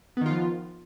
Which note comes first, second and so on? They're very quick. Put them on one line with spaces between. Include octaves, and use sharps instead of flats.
B3 D#3 F4 F3